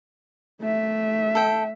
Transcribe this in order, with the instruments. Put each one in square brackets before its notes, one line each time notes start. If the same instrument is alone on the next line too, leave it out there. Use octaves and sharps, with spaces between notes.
[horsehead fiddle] A3 E5
[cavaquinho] A4 G5